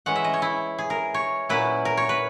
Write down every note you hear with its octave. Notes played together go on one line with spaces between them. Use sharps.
E3 G#3 C#4 F#5
E5
D#5
C#5
E4
G#4
A#4
C#5
A#2 F#3 C#4 E4 B4
A#4
C#5
B4